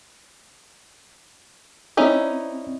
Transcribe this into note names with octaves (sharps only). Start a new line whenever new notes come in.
C4 C#4 D#4 E4 D5